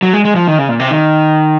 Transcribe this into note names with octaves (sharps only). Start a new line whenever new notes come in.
F#3
G#3
G#3
F3
D#3
C#3
A#2
C3
D#3